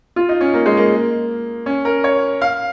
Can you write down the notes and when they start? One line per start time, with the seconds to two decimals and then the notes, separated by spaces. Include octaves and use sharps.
0.16 F4
0.29 D#4
0.41 C#4
0.54 A#3
0.66 G#3
0.77 A#3
1.66 C#4
1.85 A#4
2.04 C#5
2.41 F5